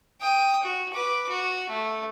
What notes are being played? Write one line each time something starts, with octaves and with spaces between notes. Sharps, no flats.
G5 D#6
F#4
B4 D6
F#4
A3